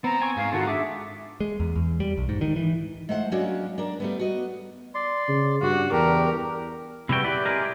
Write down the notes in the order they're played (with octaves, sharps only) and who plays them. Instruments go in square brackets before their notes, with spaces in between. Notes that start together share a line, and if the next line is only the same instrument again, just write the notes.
[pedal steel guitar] B3 [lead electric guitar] C4 [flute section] A#5
[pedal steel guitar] G#5 C#6
[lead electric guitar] G#2 [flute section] F5
[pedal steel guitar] D#3 F4 [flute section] F#4 A4 F#5
[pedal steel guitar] D4 G#4 D6 [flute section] E5
[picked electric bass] G#3
E2
E2
G3
B1
G#2
D#3
E3
[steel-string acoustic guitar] G#3 A3 C5 F#5
F#3 G#3 A#3 C#4 D4 F#4
D4 A#4
G3 A3 B3
F#4 D#5
[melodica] D5 C6
[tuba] C#3
[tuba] G2 [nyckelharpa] F#4
[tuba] E2 [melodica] D4 G4 [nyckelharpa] A#4
[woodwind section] E2 E5 [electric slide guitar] C3 G3 G5 [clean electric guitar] E4 F#4
[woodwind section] E4 G4 [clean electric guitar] B4 [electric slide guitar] D5
[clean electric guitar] G#3 G#4 A#4